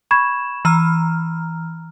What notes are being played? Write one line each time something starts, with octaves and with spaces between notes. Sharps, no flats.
B5 C#6 G#6 E7
E3 A#5 F6